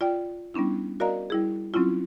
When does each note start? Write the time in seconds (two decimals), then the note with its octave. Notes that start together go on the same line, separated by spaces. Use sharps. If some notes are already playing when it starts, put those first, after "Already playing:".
0.01 F4 D5 G5
0.54 G3 B3 C#4 D4 E4
1.00 F#4 A#4 D5 D#5 F5 A#5
1.30 G3 E4 G#4
1.74 F#3 C4 C#4 E4 F4